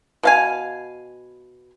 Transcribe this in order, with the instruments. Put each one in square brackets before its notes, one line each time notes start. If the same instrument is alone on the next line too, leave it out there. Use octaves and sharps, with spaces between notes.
[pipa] B2 F5 G#5